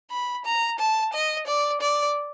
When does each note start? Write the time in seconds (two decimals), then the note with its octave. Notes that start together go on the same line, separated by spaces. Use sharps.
0.11 B5
0.46 A#5
0.79 A5
1.13 D#5
1.47 D5
1.81 D5